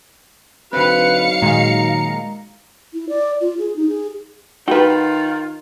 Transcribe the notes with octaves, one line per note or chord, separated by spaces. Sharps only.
D3 F#3 C4 D#4 F#4 B4 F5 C#7
A#2 D#3 G#3 A#5
E4
D5
F4
G#4
D#4
G#4
D#3 D#4 F4 F#4 B4 G5